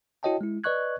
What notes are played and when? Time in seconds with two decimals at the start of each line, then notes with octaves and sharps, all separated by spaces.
0.23 E4 F#4 C#5 D#5 G5 A5
0.41 G#3 E4
0.64 B4 D5 D#5 C#6 F#6 G#6